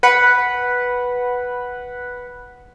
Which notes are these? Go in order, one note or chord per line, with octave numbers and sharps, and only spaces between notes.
B4 F#5 B5